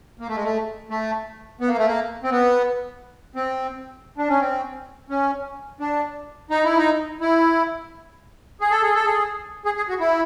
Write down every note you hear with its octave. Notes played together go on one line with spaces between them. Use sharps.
A#3
A3
G#3
A3
A3
B3
A#3
A3
A#3
C4
B3
C4
D4
C#4
C4
C#4
D4
D#4
E4
D#4
E4
G#4
A4
G#4
A4
G#4
G#4
G#4
F#4
E4